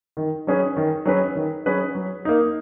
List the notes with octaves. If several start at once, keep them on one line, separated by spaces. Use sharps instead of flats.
D#3
F#3 C#4 G#4 B4
D#3
F#3 C#4 G#4 B4
D#3
F#3 C#4 G#4 B4
F#3
A#3 D#4